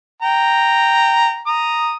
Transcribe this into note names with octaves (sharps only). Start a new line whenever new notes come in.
G5 A#5
A#5 D#6